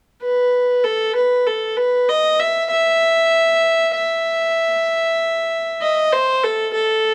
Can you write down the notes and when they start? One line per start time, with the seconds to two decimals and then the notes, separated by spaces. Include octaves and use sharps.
0.23 B4
0.84 A4
1.15 B4
1.46 A4
1.77 B4
2.09 D#5
2.40 E5
2.71 E5
3.95 E5
5.81 D#5
6.13 C5
6.44 A4
6.75 A4